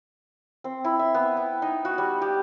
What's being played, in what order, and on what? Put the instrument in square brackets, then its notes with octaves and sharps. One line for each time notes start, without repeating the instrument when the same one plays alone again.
[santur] C4
E4
E5
B3
G5
D#4
F#4
G3
G4